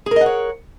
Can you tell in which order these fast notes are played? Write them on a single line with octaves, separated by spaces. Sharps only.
G#4 A#4 D#5 F#5 C#5